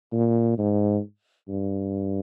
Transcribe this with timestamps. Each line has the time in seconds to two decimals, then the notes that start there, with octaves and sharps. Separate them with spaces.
0.12 A#2
0.58 G#2
1.49 G2